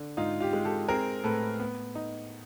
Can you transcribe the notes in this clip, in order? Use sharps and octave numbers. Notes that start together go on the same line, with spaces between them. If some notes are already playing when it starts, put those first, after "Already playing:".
Already playing: D3
G#2 D#4 F4
F4 G4
G#3
G4 A4
C4 G#4 A#4
A2 A4 B4
B3
D#4